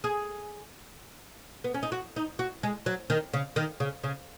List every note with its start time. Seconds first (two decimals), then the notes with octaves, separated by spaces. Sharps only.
0.04 G#4
1.64 B3
1.74 C#4
1.83 D#4
1.92 F#4
2.16 D#4
2.39 F#4
2.63 G#3
2.86 F#3
3.10 D#3
3.34 C#3
3.56 D#3
3.80 C#3
4.04 C#3